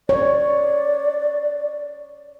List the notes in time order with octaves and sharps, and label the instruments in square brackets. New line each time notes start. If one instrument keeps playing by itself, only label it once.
[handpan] C#5 [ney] D5